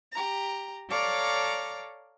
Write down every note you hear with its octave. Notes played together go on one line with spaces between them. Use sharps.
G4 A#5
A4 C#5 D5 F5 A#5 D6